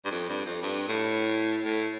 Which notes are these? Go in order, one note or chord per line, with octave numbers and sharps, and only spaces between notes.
G2
F2
G2
F2
G2
A2
A2